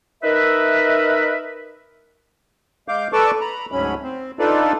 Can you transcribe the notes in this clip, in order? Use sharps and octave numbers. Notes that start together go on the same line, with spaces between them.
D#4 A#4 B4 E5
G#3 F5 D6 G6
A4 B4 D5 A5 C#6 D6
A#5 B5
D2 G#2 F#3 C#4 B5
C4
D4 D#4 F4 A4 B4 D5